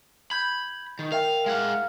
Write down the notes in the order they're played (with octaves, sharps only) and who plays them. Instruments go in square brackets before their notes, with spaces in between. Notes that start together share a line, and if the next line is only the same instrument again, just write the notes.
[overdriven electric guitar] B5 [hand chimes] G6 G#6
[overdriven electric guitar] D#3
[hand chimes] A#4 E5 G5 [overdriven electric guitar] F5
[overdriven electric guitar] G#3 F#5 [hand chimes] F5 F6